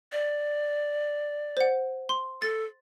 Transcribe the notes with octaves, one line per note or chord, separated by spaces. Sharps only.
D5
C5 F#5
C6
A4 A6